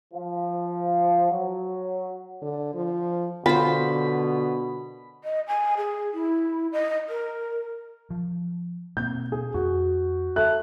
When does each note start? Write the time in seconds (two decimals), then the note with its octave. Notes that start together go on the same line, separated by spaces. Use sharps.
0.14 F3
1.31 F#3
2.42 D3
2.74 F3
3.46 B2 D3 F4 C5 B5
5.24 D#5
5.48 G#5
5.77 G#4
6.14 E4
6.72 D#5
7.09 A#4
8.10 F3
8.97 B2 A#3 C4 G6
9.32 G#4
9.54 F2 F#4
10.36 A3 F#6